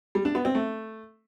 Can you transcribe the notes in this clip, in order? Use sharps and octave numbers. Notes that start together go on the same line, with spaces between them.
G3
D4
B3
C4
A3